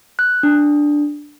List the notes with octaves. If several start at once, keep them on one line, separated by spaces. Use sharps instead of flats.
F#6
D4